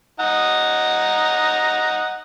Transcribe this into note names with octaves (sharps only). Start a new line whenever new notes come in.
D#4 F#5 A#5